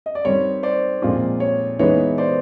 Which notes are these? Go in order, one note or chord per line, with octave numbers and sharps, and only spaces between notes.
D#5
D5
D#3 G3 C4 C#5
C5 D5
A#2 F3 G#3 C4 F4
C#5
E3 G#3 B3 D#4 C#5
C5 D5